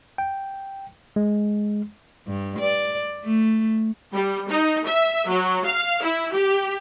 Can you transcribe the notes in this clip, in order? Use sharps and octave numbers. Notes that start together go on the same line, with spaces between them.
G5
G#3
G2
D5
A3
G3
D#4
E5
F#3
F5
E4
G4